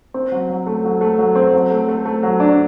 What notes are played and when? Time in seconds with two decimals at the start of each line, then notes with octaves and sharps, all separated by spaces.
0.14 C4
0.32 F#3
0.50 F#3
0.67 A3
0.84 F#3
1.01 A3
1.18 F#3
1.35 C4
1.53 F#3
1.71 A3
1.88 A3
2.05 A3
2.23 F#3
2.40 D4